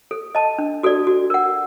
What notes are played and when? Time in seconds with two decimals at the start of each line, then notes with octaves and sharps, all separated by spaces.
0.11 A4
0.35 D#5 A5
0.58 D4
0.83 F#4 A4 D5
1.07 F#4
1.30 A#4 F#5